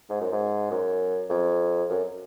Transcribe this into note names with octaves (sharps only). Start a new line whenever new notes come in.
G#2
F#2
G#2
F#2
F2
F#2